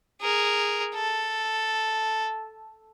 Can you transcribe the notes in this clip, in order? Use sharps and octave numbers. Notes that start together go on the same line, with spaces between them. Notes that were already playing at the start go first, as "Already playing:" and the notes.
G#4 A#4
A4